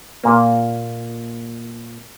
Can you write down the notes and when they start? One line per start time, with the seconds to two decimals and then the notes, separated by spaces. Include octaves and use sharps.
0.24 A#2 A#3